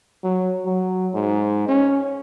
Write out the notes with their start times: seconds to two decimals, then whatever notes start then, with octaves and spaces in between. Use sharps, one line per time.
0.23 F#3
0.65 F#3
1.14 G#2
1.68 C#4